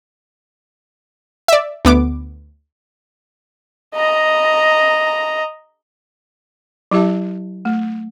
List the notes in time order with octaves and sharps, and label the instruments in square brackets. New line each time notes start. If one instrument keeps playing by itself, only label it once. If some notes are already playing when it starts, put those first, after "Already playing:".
[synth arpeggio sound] D5 E5
D2 B3 D6
[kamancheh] D#5 A#5
[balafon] F#3 E4 G4 E5 A5
A3